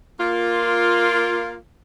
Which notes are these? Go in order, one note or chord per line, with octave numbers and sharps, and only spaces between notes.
A#3 F4